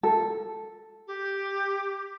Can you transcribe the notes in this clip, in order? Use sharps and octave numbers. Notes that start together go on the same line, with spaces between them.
A4
G4